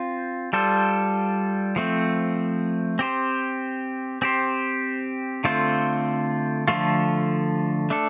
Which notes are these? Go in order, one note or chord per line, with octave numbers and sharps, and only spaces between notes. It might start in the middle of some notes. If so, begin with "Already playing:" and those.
Already playing: C4 F4 C5
G3 F4 A4 C5
F3 A3 C4
C4 G4 C5
C4 G4 C5
D3 A3 C4 F4 C5
D3 F3 A3 F4
A3 D4 A4